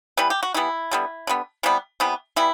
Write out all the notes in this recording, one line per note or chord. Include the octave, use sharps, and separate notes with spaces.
E3 G3 B3 B4
G4
F#4
E3 G3 B3 E4
D3 G3 B3
D3 G3 B3
C3 E3 G3 B3
C3 E3 G3 B3
E3 G3 B3 E4